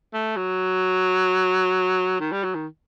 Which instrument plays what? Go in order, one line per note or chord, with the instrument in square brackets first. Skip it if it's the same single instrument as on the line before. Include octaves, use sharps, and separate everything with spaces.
[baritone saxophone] A3
F#3
D#3
G3
F#3
D#3